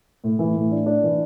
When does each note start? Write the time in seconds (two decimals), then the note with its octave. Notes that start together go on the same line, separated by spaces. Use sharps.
0.24 A2
0.39 E3
0.56 A2
0.71 D4
0.86 D4
1.03 E3